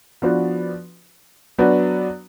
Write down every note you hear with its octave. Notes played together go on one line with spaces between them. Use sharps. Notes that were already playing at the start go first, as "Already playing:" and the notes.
F3 B3 D4 F#4 B4
F#3 B3 D4 F#4